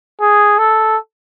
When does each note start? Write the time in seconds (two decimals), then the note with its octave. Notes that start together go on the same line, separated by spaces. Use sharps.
0.21 G#4
0.58 A4